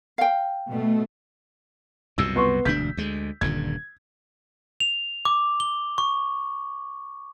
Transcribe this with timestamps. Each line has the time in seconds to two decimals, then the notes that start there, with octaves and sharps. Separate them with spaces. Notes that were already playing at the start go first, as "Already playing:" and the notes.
0.18 F5 G5
0.68 B2 A3
2.18 C2 F#2 B2 E6
2.36 B3 C6 C#6
2.65 E1 D2 D4 G6 B6
2.97 D2 G#3
3.41 D#1 G2 D3 G#6
4.80 F7
5.25 D6
5.60 G7
5.98 C#6